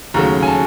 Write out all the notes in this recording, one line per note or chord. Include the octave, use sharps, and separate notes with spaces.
D#2 C#3 F#3 A3 A#5
G#5
A5